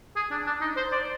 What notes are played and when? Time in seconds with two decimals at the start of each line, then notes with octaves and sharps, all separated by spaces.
0.16 G#4
0.31 D4
0.46 D4
0.61 D#4
0.77 C5
0.92 D5